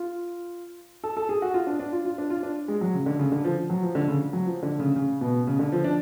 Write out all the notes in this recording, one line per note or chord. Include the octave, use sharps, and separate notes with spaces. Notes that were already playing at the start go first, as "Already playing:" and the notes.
Already playing: F4
A4
A4
G#4
F#4
F4
D4
D4
F4
F4
D4
F4
D4
G#3
F#3
C#3
D3
C#3
D3
F3
F#3
F3
D3
C#3
F#3
F3
D3
C#3
C#3
B2
C#3
D3
F3
D4